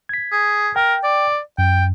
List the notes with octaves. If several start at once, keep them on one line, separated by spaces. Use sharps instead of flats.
G#6 B6
G#4
A#4 G5
D5
F#2 G5